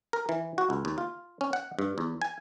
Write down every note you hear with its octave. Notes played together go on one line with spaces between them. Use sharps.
A#4
E3
F#4
C#2
D#2
F4
C#4
F#5
G2
E2
G#5